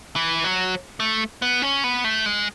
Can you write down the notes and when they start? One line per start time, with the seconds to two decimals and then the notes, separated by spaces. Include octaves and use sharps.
0.16 E3
0.44 F#3
1.00 A3
1.42 B3
1.62 C#4
1.84 B3
2.04 A3
2.26 G#3